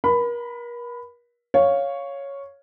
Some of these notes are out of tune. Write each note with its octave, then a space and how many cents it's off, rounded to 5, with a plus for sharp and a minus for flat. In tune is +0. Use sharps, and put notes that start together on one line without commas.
A#4 +40 B5 +10
C#5 +0 F5 +0